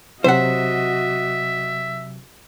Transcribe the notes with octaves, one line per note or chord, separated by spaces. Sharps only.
C3 F#3 F#4 C5 D#5 E5 F#5